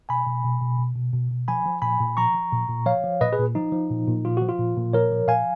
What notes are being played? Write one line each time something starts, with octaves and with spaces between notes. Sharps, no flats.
B2 G#5 B5
B2
B2
B2
B2
B2
B2
B2
F3 G#5 B5
F3
A#2 G#5 B5
A#2
F3 A#5 C#6
F3
A#2
A#2
F3 C#5 F5
F3
A#2 B4 D#5
G#4 B4
A#2
F3 D#4
F3
A#2
A#2
F3 F4
F3 F#4
F4
A#2
A#2
F3 A#4 C#5
F3
A#2 F5 G#5